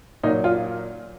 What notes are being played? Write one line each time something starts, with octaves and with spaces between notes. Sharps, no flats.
A#2 F#3 D#4
F4